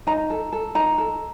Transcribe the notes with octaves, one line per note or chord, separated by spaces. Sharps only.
D#4 A#5
A4
A4
D#4 A#5
A4